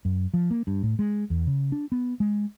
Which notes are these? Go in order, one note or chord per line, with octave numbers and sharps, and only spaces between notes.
F#2
F3
A#3
G2
A2
G#3
E2
C#3
D4
B3
G#3